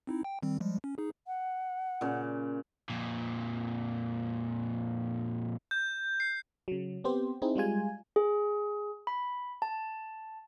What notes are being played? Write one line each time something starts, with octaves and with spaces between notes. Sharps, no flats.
C4 D#4 E4
G5
D#3 G3 C4
F3 G3 G#3
C#4
D#4 G#4
F#5
A#2 C#3
F2 A#2
G6
C7
C#3 F#3
B3 C4 G4 C5
C4 D#4 E4 G#4
G3 G#3 F4 G#5
G#4
B5
A5